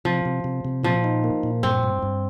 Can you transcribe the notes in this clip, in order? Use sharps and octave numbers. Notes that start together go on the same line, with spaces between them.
C3 F3
C3
C3
C3
A#2 F3
D#4
A#3
A#2
G2 C4
G2
G2